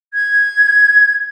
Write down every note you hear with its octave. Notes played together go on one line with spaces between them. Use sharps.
G#6